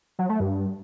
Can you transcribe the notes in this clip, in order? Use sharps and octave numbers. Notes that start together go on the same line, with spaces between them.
F#3
A3
G2